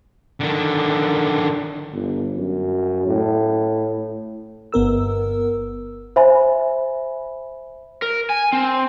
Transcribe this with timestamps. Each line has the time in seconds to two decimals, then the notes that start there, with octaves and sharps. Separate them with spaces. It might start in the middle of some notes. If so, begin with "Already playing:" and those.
0.40 D3 D#3
1.93 G1
2.36 F#2
3.07 A2
4.72 G1 B3 A#4 E6
6.16 C5 E5 G#5 B5
8.02 A#4
8.30 G#5
8.53 C4